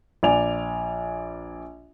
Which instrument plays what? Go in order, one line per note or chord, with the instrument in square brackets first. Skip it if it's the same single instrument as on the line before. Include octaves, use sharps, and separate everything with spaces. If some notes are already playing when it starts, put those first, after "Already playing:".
[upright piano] A#1 D5 G#5 F7